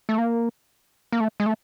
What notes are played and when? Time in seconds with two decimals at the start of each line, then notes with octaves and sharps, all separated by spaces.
0.09 A3
0.18 A#3
1.12 A#3
1.20 A3
1.40 G#3
1.46 A3